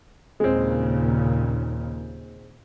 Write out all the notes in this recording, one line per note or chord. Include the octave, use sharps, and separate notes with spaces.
D#2 A#2 C#3 G#3 C4